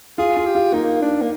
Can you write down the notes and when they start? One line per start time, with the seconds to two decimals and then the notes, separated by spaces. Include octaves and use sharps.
0.18 F4 G#4
0.37 F4
0.46 G4
0.55 F4
0.73 A#3 D#4
1.02 D4
1.21 A#3